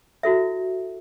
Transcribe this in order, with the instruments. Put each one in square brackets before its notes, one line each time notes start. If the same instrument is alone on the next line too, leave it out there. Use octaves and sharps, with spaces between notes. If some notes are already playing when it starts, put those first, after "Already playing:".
[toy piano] E4 F#4 A4 E5